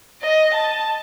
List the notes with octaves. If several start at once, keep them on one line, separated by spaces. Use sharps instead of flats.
D#5
A5